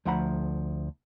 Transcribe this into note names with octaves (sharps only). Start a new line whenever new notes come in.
D2 F3 A3 F#5 A#5 B5